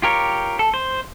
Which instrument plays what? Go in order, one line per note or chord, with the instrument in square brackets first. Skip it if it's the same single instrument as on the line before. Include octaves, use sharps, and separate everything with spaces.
[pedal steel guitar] F4 G4 A#4 C#5
A4
C5